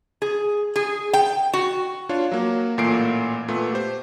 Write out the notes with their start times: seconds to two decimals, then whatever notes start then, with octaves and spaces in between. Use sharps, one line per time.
0.22 G#4
0.76 G#4
1.13 G5
1.53 F#4
2.09 D4 F4 C#5
2.32 F#3 A#3
2.78 A1 A#2 A3 A#3 C7 D7
3.48 A#2 A3 B3
3.73 G4 C5